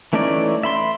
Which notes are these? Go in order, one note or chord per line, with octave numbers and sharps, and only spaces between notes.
E3 A3 C#4 D#4 D5
E5 B5 C6